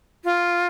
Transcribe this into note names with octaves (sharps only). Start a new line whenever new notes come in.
F4